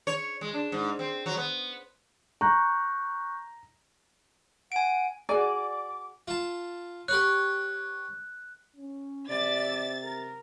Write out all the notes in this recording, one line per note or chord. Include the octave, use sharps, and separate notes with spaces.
C#5
G#3
D4
G#2
C4
F#3
B3
A#5 C#6 F#6 G6
F#5 G#5 D7
F#4 G#4 D5 G#5 D6
F4 A5
G4 B4 C#5 F#6
C#4
C3 D5 E5 A6
A#4